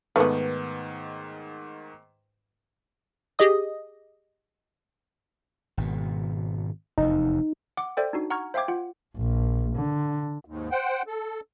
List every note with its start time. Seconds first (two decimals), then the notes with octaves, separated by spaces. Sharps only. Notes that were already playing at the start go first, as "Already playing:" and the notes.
0.16 G#2 D#3 A3 B3 B4
3.39 G4 G#4 D#5 D#6
5.77 G#1 B2
6.98 F1 E2 D#4
7.77 F#5 D6
7.97 A4 C5 D5 E5 G5
8.13 D4 D#4 F#4
8.30 F#5 A#5 C#6 F6 G#6
8.54 C5 E5 F5 G5 D6 G#6
8.68 F4 F#5
9.17 A#1
9.77 D3
10.45 D#2 G#2
10.71 C5 F#5 G5
11.07 A4